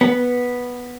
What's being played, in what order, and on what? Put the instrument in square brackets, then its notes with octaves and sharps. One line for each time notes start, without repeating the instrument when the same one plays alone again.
[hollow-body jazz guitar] B3